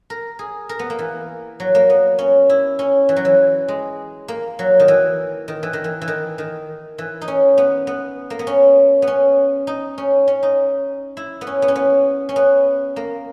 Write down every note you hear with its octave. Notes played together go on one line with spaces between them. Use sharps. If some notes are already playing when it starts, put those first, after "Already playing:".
A#4
G#4
A#4
B3
A#3
E3
F#3
A#3
B3
C#4
E4
C#4
E3
F#3
E3
G#3
A#3
F#3
D#3
E3
D#3
E3
D#3
E3
E3
D#3
D#3
E3
D#4
C#4
B3
B3
A#3
B3
C#4
B3
C#4
D#4
C#4
C#4
D#4
E4
B3
C#4
B3
C#4
B3
C#4
B3
A#3